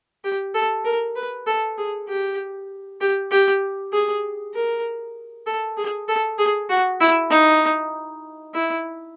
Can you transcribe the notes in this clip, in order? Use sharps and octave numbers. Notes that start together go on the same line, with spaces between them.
G4
A4
A#4
B4
A4
G#4
G4
G4
G4
G#4
A#4
A4
G#4
A4
G#4
F#4
E4
D#4
E4